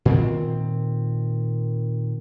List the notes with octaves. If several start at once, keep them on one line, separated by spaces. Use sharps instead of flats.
A#2 D#3 C4